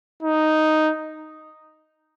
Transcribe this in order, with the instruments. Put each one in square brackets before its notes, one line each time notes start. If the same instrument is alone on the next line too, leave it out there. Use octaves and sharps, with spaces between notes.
[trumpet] D#4